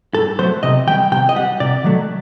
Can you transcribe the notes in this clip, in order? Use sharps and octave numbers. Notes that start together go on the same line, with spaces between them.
G2 A4
F#3 A3 C5
C3 D#5
D#3 G3 G5
C3 G5
D#5
G3 F#5
C3 D5
D#3 F#3 A3